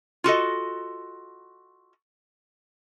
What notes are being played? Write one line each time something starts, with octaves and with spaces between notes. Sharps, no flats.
F4 F#4 A4 D#5